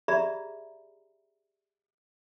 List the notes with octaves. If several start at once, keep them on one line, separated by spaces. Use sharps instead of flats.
G4 G#4 D5 E5 A#5 B5